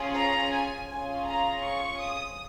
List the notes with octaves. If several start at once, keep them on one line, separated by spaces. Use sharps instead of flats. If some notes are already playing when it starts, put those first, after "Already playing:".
Already playing: C#4 F4 G#4
A#5
G#5
C#4 F4 G#4 G#5
A#5
C#6
D#6